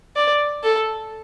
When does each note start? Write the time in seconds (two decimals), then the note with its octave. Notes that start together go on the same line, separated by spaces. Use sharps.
0.16 D5
0.63 A4